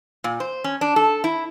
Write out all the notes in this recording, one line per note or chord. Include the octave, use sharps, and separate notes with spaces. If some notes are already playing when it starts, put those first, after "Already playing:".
A#2
C5
C#4
D4
A4
E4